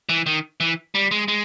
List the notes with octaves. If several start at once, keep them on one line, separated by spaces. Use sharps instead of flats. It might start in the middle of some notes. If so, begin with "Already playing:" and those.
E3
D#3
E3
G3
G#3
G#3